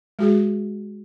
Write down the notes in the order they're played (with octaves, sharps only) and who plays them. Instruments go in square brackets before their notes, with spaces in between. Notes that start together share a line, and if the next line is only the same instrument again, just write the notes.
[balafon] G#3 F#4 G#4